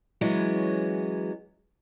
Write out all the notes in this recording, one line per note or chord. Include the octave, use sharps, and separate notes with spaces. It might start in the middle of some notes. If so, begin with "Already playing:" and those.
E3 F#3 G#3 B3 C#4